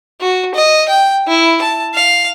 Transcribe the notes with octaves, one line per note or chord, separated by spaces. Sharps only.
F#4
D#5
G5
E4
A5
F5